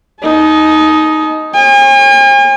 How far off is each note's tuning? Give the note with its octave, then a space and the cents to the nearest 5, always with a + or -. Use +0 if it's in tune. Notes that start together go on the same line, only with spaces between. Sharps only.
D#4 +5 A5 -45
C#5 -40 G#5 -45